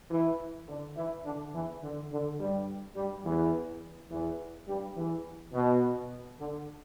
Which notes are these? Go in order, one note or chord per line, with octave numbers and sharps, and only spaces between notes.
E3 E4
D3 D4
E3 E4
D3 D4
E2 E3
D3
D3
G2 G3
G2 G3
E2 E3
E2 E3
G2 G3
E2 E3
B2
D3